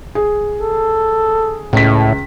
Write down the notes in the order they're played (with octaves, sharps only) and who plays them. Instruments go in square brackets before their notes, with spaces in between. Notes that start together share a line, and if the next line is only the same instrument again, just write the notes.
[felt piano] G#4
[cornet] A4
[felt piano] C#2 B6 [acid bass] A2